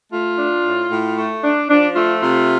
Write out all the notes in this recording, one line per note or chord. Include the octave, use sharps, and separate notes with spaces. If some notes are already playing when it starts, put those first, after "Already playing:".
A3 F4
D4
A2
A2
A3
D4
F3 D4
A3 F4
C3 F4